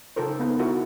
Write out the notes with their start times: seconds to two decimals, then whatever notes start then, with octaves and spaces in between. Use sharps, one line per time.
0.16 C#3 D#4 A4 A#4 C5
0.39 B3 D#4
0.59 E4 F#4 A#4